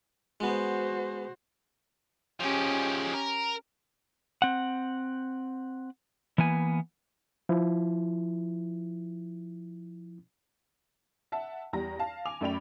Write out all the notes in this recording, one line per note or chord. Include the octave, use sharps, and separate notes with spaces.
G#3 B3 F#4 C5
F3 G#3 C#4 G4
A#4
C4 F#5
E3 A#3 B3 G#5
F3 E4
E5 F#5 A5
E2 G3 A#5 A#6
F5 A5
G#5 D6 F7
F#2 A3 D5 G5 B5 F7